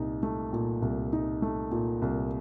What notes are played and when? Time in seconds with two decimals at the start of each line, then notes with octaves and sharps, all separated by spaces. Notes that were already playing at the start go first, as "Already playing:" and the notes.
Already playing: C2 A#2 D#4
0.23 A3
0.53 A#2
0.82 C2
1.13 D#4
1.42 A3
1.72 A#2
2.02 C2